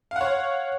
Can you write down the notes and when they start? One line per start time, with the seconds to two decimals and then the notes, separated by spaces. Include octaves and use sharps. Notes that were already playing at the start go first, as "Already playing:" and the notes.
0.11 F5
0.16 F#5
0.21 C#5